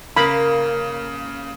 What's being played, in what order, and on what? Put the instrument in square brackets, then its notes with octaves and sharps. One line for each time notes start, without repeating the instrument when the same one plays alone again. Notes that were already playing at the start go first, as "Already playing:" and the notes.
[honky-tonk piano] C#3 [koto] A#3 [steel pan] B5